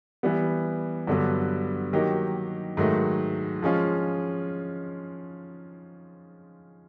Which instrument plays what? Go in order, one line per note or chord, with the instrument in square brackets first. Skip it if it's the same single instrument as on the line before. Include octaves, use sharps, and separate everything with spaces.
[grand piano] E3 G3 B3
G2 D3 F#3 B3
D#3 F#3 A#3 D#4 G4
G#2 D#3 F#3 A3
F3 G#3 C#4 F4